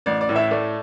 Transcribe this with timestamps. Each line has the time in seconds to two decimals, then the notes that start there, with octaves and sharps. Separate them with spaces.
0.06 A1 D5
0.21 D5
0.29 A2
0.36 E4 E5
0.51 A3 D5